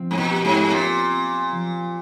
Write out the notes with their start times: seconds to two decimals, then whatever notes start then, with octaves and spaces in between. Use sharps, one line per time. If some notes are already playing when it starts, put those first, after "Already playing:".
Already playing: F3 C4
0.11 G#2
0.18 A#2
0.31 G4
0.45 G#2
0.71 A#2 C4
1.12 C4
1.52 F3